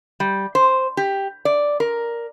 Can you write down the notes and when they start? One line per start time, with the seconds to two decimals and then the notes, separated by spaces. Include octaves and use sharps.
0.20 G3
0.55 C5
0.97 G4
1.45 D5
1.80 A#4